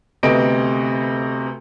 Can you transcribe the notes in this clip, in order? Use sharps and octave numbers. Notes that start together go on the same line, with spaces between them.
D2 C3 A3 B3 D#5 D7